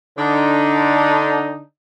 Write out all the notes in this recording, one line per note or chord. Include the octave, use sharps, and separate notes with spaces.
D3 D4 D#4